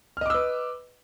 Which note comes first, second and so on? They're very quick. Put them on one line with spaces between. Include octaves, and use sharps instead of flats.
F6 D#5 D6 E6 B4